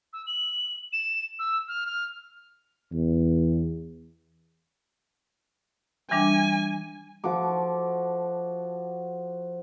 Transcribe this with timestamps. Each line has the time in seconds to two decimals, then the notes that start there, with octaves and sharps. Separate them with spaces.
0.13 E6
0.27 F#7
0.93 E7
1.39 E6
1.68 F6
1.86 F6
2.92 E2
6.11 E3 G3 D4 G#5
7.24 F3 F#4 A4 D6